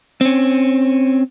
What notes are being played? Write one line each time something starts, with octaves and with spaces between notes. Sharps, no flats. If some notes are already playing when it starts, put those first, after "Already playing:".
C4 C#4